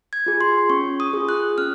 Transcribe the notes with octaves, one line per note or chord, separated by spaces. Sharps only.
G#6
F4 G#4
C6
C#4 C#6
D#6
F4 G#4
F#6
C#4 F6